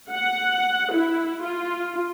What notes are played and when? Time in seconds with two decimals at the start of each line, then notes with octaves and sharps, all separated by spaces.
0.11 F#5
0.93 E4
1.41 F4